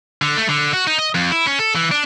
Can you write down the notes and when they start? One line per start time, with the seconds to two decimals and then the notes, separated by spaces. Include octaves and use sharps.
0.22 D3
0.37 A3
0.50 D3
0.74 F#4
0.87 D#4
0.99 D#5
1.15 F2
1.32 E4
1.47 C#4
1.59 A4
1.75 E3
1.92 D4